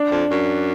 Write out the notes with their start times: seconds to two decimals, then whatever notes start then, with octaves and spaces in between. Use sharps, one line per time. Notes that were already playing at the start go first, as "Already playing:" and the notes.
Already playing: D4
0.11 F2
0.31 F#2